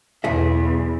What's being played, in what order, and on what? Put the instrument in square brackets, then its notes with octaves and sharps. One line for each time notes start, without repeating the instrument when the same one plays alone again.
[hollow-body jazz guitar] B1 G#4 E5 [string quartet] E2